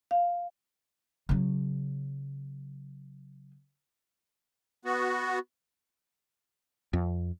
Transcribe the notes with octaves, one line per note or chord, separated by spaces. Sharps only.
F5
C#3 F#3
B3 F#4
F2